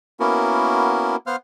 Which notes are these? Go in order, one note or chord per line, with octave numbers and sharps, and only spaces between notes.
A#3 B3 C#4 E4 F#4 A#4
B3 C5 F5 F#5 C6 F6